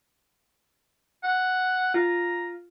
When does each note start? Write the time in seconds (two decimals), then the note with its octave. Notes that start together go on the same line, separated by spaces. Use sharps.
1.24 F#5
1.94 F4 A#5